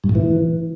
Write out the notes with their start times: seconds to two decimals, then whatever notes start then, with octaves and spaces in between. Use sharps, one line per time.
0.04 G2
0.09 A2
0.15 E3